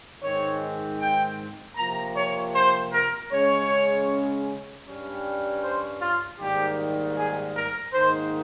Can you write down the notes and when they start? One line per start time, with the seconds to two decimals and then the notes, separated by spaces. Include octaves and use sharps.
0.23 G#2 D#3 G#3 C4 C#5
0.99 G5
1.77 C3 F3 A#3 A#5
2.16 C#5
2.54 C5
2.93 A#4
3.31 C#3 G#3 C#4 C#5
4.86 G2 G3 C#4
5.63 C5
6.01 F4
6.39 G#2 D#3 G3 A#3 D#4 G4
7.16 G#4
7.55 A#4
7.93 G#2 D#3 A#3 D#4 C5